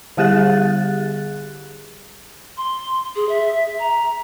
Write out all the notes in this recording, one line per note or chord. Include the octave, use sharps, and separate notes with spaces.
D3 G3 G4 G#4 F#6 A6
C6
G#4
E5
A#5